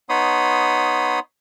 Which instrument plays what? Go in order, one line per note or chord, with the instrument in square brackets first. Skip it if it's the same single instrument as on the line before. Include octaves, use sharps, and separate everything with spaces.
[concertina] B3 D#4 C#5 B5 C6 D#6